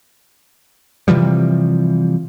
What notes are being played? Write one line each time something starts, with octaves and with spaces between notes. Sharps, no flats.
C3 E3 F3 G3